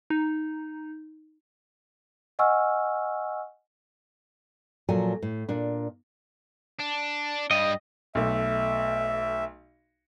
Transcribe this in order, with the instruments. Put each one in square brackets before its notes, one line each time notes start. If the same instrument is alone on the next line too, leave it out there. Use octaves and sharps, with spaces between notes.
[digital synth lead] D#4
[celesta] D#5 F#5 G#5 C#6 E6 F6
[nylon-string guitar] A#2 F3 F#3 A4 G#5
A2
A#2 D4
[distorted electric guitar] D4
[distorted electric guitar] G2 G3 [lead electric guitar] D#5
[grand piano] B1 A3 [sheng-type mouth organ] E5